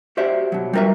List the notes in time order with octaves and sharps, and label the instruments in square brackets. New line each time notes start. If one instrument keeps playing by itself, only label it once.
[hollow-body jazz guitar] F#4 G4 C5 D5 E5
B2 F#3
G3 F4 A#4 B4 E5